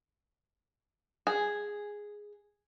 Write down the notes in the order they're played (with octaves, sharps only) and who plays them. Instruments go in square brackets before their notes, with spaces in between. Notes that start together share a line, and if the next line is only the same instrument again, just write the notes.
[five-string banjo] G#4